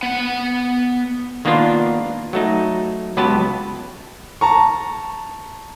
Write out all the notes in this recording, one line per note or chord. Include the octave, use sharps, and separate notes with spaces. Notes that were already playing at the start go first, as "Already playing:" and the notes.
B3 F#5
D#3 A#3 B3 D4 F4
F#3 A3 D#4
C#2 F#3 B3 G4 B4 A5
A5 A#5 C#6